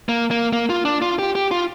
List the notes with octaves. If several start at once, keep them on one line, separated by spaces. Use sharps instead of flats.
A#3
A#3
A#3
F4
D4
F4
G4
G4
F4